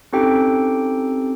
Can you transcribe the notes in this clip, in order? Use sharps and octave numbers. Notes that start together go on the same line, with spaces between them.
C4 C#4 D#4 G4 A4 G5